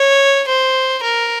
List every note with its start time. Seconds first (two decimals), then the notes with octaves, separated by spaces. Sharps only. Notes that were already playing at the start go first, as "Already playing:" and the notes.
Already playing: C#5
0.49 C5
1.03 A#4